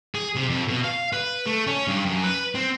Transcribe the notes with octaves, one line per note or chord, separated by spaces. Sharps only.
G#4
C3
F2
B2
F5
B4
A3
C#4
G2
F#2
B4
C4